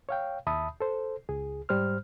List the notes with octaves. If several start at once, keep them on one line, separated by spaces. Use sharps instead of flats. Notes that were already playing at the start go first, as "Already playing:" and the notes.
C#5 F5 G5
D#2 E5 A5 B5 D#6
A4 C5
C#2 G#4
G#2 G3 C5 F6